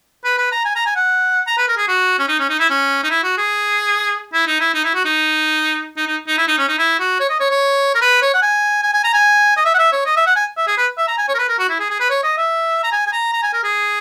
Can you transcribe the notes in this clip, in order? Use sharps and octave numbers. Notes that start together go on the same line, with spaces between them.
B4
B4
A#5
G#5
A#5
G#5
F#5
A#5
B4
A#4
G#4
F#4
C#4
D#4
C#4
D#4
E4
C#4
D#4
E4
F#4
G#4
E4
D#4
E4
D#4
E4
F#4
D#4
D#4
D#4
D#4
E4
D#4
C#4
D#4
E4
F#4
C#5
D#5
C#5
C#5
A#4
B4
C#5
F#5
G#5
G#5
G#5
A#5
G#5
D#5
E5
F#5
E5
C#5
D#5
E5
F#5
G#5
E5
G#4
B4
E5
A#5
G#5
C#5
A#4
B4
A#4
F#4
E4
G#4
G#4
B4
C#5
D#5
E5
A#5
G#5
G#5
A#5
A#5
G#5
A#4
G#4